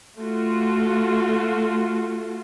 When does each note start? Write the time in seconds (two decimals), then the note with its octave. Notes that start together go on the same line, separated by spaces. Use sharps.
0.18 A3 F4 F#4